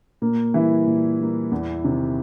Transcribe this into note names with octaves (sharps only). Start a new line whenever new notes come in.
A#2 A#3
E3 G3 A#3 E4
A#2
G3 A#3
E2
C3 D#3